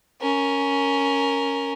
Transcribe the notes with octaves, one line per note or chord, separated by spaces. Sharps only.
C#4 A#4